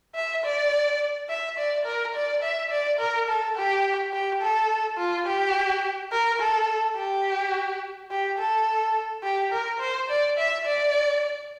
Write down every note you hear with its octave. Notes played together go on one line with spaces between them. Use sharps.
E5
D5
E5
D5
A#4
D5
E5
D5
A#4
A4
G4
G4
A4
F4
G4
A#4
A4
G4
G4
A4
G4
A#4
C5
D5
E5
D5